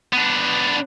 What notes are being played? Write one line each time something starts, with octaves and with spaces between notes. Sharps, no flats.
B3 D4